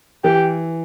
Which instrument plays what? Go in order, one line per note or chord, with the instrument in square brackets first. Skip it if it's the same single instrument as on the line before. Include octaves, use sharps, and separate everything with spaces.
[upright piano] E3 [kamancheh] G4